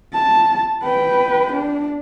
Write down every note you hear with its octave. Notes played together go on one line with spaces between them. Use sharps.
A5
B4 G5
D4